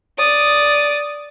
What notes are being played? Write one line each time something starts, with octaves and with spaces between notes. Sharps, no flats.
D5 D#6